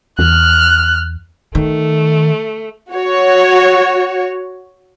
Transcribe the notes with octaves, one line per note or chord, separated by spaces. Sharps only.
E2 F6 F#6
D#3 A3
F#4 C#5